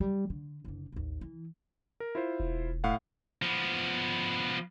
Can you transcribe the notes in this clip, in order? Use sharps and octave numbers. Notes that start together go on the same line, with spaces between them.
G3
D3
F#1 D3
A1 D#2
E3
A#4
E4 F4 C5
E1
A2 F5 F#5
F3 B3